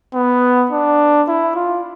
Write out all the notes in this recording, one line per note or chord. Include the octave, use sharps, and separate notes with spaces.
B3
D4
E4
F4